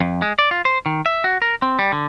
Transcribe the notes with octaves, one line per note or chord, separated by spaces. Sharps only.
F2
G#3
D5
F4
C5
D#3
E5
F#4
A#4
C4
G3
D3